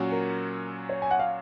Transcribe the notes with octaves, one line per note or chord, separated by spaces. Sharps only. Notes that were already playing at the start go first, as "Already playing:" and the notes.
Already playing: A#2 F#3 C#4 F#4
A#4
C#5
G#5
F#5
F5